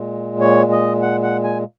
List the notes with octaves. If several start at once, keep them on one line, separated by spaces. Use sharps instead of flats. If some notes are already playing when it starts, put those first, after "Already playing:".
Already playing: A#2 G#3
C#5
D#5
F#5
F#5
G#5